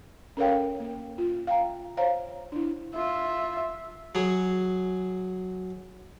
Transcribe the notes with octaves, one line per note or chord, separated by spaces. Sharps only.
C#4 A4 A#4 C#5 F5 G5
A#3
F4
F5 G5 A#5
C5 C#5 F5 A#5
D4 E4
F4 E5
F#3 G#4